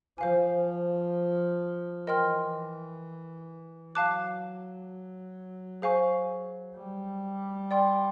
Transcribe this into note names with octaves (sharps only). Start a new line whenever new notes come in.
F3 C5 F5 G#5
E3 A#4 D#5 G5 C6 F6
F#3 F5 A5 D6 F#6
G#4 C5 F5 G#5 C#6
G3
D5 G5 C6